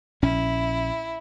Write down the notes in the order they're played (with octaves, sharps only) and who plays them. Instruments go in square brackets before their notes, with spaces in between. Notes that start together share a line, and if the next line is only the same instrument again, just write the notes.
[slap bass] A#1 C#4 [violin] E4